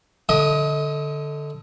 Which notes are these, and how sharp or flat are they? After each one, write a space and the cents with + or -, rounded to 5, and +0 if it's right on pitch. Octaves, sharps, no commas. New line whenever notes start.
D3 +0 D#5 +35 D#6 +0